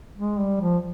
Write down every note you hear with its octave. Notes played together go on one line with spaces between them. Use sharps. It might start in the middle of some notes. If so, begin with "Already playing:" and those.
G#3
G3
F3